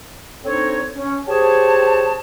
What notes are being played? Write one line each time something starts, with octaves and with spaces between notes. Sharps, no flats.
C4 D4 D#4 A4 C#5
C#4
G4 G#4 C5 C#5 A5